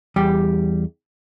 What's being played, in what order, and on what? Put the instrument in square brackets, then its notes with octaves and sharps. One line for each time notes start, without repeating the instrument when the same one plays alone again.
[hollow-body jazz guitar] E2 G3 G4